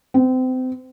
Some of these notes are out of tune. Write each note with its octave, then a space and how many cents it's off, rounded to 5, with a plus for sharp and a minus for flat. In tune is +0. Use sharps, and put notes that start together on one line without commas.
C4 -30